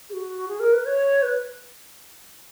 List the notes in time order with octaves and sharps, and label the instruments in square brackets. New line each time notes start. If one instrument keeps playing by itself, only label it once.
[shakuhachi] G#4
F#4
G#4
A#4
B4
C#5
B4